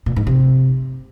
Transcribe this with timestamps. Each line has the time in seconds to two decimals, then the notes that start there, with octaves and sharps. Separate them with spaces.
0.06 A#2
0.16 G#2
0.27 C3